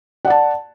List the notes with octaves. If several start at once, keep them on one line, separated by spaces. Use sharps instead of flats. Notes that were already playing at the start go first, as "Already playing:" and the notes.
D5 F#5 A5